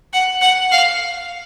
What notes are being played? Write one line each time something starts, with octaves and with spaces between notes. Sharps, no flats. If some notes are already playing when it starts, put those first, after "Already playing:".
F#5
F#5
F5